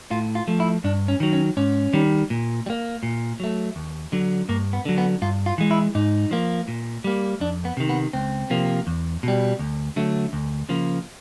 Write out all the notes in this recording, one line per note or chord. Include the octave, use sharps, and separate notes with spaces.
A2 F4
F4
F3 A3
E4
G2 D4
C#4
D#3 F#3
C#4
G#2 C#4
D#3 G3
A#2
G3
A#3
A#2
F#3 A3
D#2
D3 F#3
G2 A#3
B3
D3 F#3
B3
G2 F4
F4
E3 G#3
E4
G#2 D#4
F3 A#3
A#2
G3 A#3
F2 D4
B3
C3 D#3
B3
C#2 C4
C3 F3 A#3
E2
B2 G3
D2
D3 F#3 A3
D2
C#3 F3 A#3